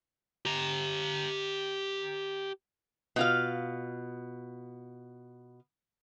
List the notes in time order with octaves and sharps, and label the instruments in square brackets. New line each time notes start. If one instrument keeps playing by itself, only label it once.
[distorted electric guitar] G4 A#5
[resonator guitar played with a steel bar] B2 F4 F5